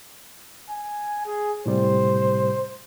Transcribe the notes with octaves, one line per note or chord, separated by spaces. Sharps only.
G#5
G#4
A2 C3 G3 C5